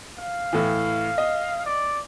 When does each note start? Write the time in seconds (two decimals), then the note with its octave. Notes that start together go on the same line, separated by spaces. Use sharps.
0.19 F5
0.53 A2 E3
1.18 D#5
1.66 D5